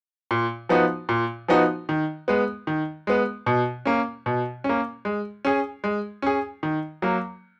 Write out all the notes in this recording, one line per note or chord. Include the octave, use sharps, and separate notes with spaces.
A#2
F3 B3 D#4 F#4
A#2
F3 B3 D#4 F#4
D#3
G#3 B3
D#3
G#3 B3
B2
A#3 C#4
B2
C#4
A#3
G#3
C#4 G#4
G#3
C#4 G#4
D#3
F#3 A#3